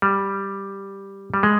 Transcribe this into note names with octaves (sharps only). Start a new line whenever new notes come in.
G3
G3
G#3